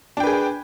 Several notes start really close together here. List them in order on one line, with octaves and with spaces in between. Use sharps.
D4 G5 B4 G#4